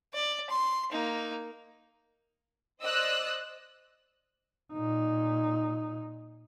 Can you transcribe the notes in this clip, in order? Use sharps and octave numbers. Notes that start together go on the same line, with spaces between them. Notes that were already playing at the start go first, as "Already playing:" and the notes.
D5
C6
A#3 D#4
C5 D5 D#5 D#6 E6 F#6
A#2 D#4